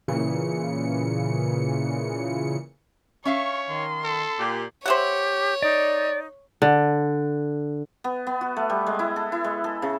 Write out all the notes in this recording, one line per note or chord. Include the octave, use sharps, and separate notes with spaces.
A#2 C#3 E3 C#7
C#4 C#5 E5 F5 C#6
D#3 C6
A4
A#2 G4
G4 C5 C#5 E5 F#5
D#4 D5
D3
B3
B3
F#4
A3
G3
G#3
E4
A4
E4
G#3
A4
C#3